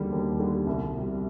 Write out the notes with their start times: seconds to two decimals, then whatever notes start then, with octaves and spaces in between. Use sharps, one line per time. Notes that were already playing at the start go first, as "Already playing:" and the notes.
Already playing: D#2 D3 G3
0.12 D#2
0.40 D3 G3
0.67 C2
0.95 C3 G3